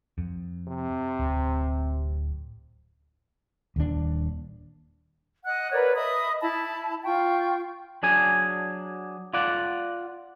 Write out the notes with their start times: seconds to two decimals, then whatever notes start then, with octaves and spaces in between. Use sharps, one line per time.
0.18 F2
0.67 C3
1.20 D1
3.76 D#1 D#2 D#3 D4
5.44 D#5 F#5 F#6
5.72 A#4 B4 C#5 D5
5.94 D#5 E5 B5 D#6
6.41 E4 E5 A5 B5
7.04 F4 G5 C#6
8.03 F#3 D4 G#4 G#5
9.34 F4 D5 F#5